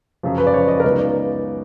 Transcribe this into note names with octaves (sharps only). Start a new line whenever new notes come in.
F#2 C#3 F3
B4
D5
F#2 C#3 F3 C#5
D#5
A#4
C#2 C#3 F#3 B3 D#4 B4
D5